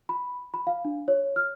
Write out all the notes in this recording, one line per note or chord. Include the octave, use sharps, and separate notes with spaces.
B5
B5
F5
D4
C#5
F6